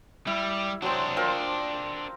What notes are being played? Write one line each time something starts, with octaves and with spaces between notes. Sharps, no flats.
G3 E4
F#3 C4 D4 C5
C4 F4 A#4